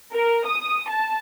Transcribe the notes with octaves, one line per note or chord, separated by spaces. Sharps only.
A#4
D#6
A5